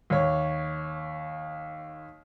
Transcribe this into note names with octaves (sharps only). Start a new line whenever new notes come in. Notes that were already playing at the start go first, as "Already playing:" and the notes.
D#2 C#5